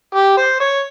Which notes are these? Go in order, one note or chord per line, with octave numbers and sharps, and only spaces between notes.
G4
C5
C#5